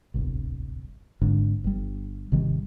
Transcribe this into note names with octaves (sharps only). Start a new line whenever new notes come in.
D1 G1 C2
G#1 G#2 D3
G1 G3
G#1 C3 D#3 G3